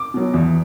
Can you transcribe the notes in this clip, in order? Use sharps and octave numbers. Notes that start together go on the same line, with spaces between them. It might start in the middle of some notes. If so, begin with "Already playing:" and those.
Already playing: D6
B2 F#3
E2